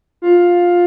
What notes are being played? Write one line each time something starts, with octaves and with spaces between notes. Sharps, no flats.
F4